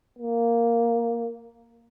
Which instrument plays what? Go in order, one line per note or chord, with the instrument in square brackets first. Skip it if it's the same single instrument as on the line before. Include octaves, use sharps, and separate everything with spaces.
[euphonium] A#3